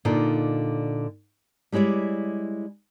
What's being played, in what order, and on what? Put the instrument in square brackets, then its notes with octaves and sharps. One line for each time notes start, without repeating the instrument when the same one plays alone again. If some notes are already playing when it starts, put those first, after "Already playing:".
[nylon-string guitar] A#2 D3 D#4 F4
G3 G#3 E4 C#5 D5